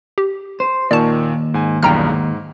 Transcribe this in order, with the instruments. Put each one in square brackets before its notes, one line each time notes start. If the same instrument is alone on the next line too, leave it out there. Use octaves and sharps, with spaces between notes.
[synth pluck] G4
[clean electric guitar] C5
[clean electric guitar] D#2 [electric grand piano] A#2 D#3 C#6 [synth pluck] D5 A5
[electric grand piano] G#2 G#5
[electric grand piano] B1 E2 G2 [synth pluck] G5 A#5 F6
[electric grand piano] G#2